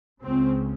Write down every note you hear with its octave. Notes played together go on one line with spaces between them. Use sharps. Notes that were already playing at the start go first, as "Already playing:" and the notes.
C#2 C#3 C4